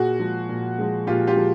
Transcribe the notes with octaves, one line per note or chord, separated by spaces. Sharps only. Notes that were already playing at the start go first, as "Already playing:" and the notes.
Already playing: A#2 F#4 G#4
F3 G#3
A#2
F3 G#3
A#2 F4 G4
F4 G4
F3 G#3